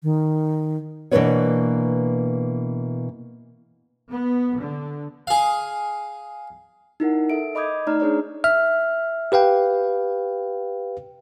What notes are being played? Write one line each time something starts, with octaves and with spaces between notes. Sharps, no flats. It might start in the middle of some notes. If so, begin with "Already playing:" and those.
D#3
B2 E3 A#3 D4 B4 C#5
B3
D3
G#4 F5
D#4 E4 A#4 F#5
A4 E5 D7
D#5 B5 D6 D#6 G6 G#6
A3 D#4 D5 A#5 F6
D4 G#4 B4 C#5 D5
E5 F6
G4 B4 F5 G5